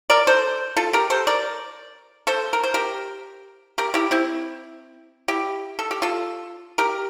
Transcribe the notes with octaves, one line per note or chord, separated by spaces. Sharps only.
A#4 D5
A4 C5
F4 A4
G4 A#4
A4 C5
A#4 D5
A4 C5
A#4
C5
G4 A#4
G4 A#4
E4 G4
C4 E4
E4 G4
A4
G4
F4 A4
G4 A#4